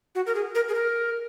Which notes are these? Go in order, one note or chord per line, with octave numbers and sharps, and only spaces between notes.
F#4
A#4
G#4
A#4
G#4
A#4